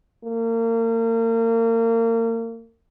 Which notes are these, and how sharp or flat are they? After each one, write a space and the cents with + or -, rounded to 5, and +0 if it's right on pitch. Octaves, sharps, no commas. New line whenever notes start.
A#3 -35